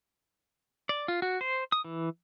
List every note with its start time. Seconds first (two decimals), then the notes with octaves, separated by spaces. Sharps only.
0.89 D5
1.08 F4
1.22 F#4
1.41 C5
1.72 D#6
1.84 E3